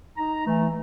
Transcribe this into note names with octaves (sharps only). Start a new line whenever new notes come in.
D#4 A#5
E3 A3